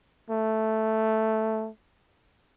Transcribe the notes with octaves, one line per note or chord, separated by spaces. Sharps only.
A3